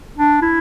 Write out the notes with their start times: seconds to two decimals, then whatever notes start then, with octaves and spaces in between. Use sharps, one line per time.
0.18 D4
0.42 E4